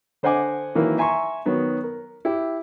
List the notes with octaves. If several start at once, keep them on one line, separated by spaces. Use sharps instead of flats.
D3 C5 D#5 F#5 G#5 D6
D#3 E3 F#3 A#3 D#4 E4
E5 G#5 A#5 C6 C#6
D#3 F#3 B3 F#4
A#4
E4 G4